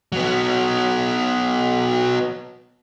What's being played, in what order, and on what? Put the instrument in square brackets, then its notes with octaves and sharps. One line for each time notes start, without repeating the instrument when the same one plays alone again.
[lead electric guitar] F#3 B3